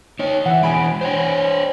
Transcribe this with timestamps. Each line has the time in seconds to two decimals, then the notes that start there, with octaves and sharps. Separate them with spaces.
0.19 D#4 C#5
0.46 E3 E5 F#5
0.63 E3 G#3 G#5 B5 D7
1.01 C5 C#5 G5